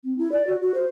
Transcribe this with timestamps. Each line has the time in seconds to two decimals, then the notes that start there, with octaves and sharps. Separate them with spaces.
0.04 C4
0.18 E4
0.32 D5
0.47 F#4
0.61 F#4
0.74 C5